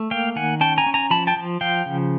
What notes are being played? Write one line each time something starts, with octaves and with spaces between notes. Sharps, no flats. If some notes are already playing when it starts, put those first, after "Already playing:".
Already playing: A3
A#3 F5 G5
D#3 F#5 G#5
C#4 G5 A5
G#5 A#5
C#4
G#5 A#5
F3 A5 B5
G5 A5
F3
F3 F5 G5
C#3